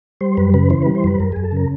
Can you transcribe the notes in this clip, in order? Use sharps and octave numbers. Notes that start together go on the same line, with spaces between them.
G3 C5
F#2 B4
C#3 B4
E3 C5
G3 B4
C5
F#2 B4
F#2 A#4
F#2 G#4
A4
C#3 A#4